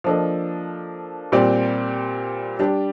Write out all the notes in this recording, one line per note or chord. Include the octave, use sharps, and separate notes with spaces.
F3 A#3 D4 A4 D#5
A#2 G3 C4 G4 D5
G3 D4 G4